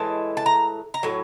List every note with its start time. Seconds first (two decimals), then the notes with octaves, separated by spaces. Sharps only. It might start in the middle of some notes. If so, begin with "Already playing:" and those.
Already playing: A2 E3 G#3 A5
0.37 A5
0.46 A#5
0.94 A#5
1.03 A2 F#3